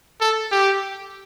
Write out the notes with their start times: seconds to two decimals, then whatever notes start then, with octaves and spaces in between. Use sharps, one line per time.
0.21 A4
0.52 G4